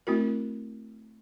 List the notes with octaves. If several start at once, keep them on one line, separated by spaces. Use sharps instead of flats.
A3 C4 E4 F#4 A#4